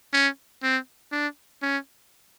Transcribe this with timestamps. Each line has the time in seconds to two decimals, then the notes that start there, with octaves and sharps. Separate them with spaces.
0.13 C#4
0.63 C4
1.12 D4
1.62 C#4